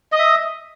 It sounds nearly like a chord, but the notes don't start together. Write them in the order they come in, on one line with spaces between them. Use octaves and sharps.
D#5 D#6 E5